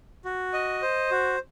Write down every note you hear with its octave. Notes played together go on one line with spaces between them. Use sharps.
F#4
D#5
C5
F#4